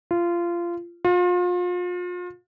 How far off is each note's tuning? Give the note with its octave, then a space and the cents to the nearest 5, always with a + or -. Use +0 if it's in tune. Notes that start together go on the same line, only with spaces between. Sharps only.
F4 -20
F4 +35